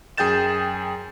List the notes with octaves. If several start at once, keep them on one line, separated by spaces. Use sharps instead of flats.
F#2 G#4 G5 G6 A6 E7